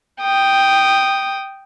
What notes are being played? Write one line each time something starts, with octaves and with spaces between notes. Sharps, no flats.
G5 D#6